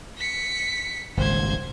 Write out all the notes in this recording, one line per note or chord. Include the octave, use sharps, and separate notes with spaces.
B6 C#7
D#1 G#1 C#2 C5 G#6